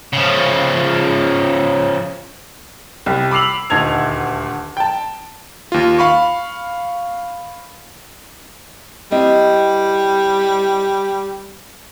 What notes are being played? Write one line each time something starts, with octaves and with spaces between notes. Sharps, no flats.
C#3 F3
C2 G3
B5 D6 E6 C7 F7 F#7
D#1 D2 D#4 A5 G#6 F7
G5 A5
D#2 F4
F5 B5 C#6
G3 C4 E4 D#5